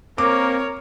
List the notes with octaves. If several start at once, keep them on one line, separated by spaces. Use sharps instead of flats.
A#3 C4 A#4 C#5 D6